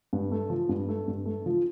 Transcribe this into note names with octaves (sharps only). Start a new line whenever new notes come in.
G2
A3
F3
G2
A3
G2
A3
F3